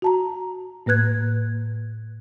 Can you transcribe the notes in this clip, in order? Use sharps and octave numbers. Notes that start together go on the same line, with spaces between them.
F#4 A5 A#5
A2 A#3 B4 F#6 G#6